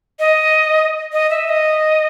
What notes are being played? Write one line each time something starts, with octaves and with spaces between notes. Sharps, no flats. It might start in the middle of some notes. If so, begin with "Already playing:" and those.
D#5
D#5
E5
D#5